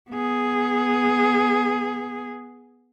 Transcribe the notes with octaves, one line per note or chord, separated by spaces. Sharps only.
B3 G#4